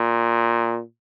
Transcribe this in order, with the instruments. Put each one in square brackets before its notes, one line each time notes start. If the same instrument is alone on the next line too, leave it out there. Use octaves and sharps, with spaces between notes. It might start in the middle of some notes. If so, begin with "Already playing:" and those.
Already playing: [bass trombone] A#2